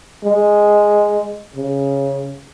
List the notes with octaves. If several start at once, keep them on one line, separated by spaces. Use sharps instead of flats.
G#3
C#3